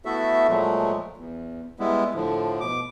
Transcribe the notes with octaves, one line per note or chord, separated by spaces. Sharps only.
A3 B3 E4 F#4 A4 E5
A#2 F3 F#3 G#3 A3
E2
G3 G#3 B3 E4
A2 D3 F3
B2 D6